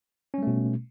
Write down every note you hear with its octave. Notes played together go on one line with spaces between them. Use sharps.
B2 G3 A3 C#4